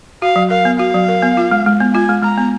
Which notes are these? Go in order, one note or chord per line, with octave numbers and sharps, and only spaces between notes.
F#4 F5
F#3
A#4 F5
B3
F#4 F5
F#3
A#4
B3
F4
G#3
G#3
B3
F4 G#5
G#3
G#3 A#5
B3